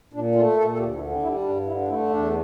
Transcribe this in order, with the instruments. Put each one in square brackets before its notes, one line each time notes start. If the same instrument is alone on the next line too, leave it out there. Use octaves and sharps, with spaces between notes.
[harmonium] A#2 D4
A3 F4
A#2 A4
A4
D2 G4
E4
D3
C4
G3 E4
D4
G2 D4
D3 E4
D4
A3 E4
E2 D4